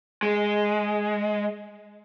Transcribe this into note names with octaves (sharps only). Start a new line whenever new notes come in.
G#3